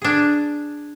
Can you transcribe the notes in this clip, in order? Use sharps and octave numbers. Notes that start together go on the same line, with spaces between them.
D4 G#4